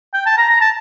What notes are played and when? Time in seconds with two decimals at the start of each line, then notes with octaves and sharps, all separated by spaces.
0.14 G5
0.26 A5
0.38 A#5
0.49 A#5
0.61 A5